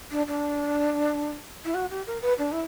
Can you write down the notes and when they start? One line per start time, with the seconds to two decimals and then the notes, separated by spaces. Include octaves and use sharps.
0.11 D4
0.27 D4
1.65 E4
1.74 F#4
1.90 G4
2.07 A#4
2.22 B4
2.38 D4
2.52 E4